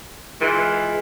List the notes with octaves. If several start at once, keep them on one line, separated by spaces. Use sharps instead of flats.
E3 G#3 F4